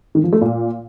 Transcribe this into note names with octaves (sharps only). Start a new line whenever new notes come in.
D#3
F3
A3
A#2